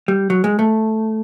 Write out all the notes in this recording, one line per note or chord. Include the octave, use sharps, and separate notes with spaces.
G3
F#3
G#3
A3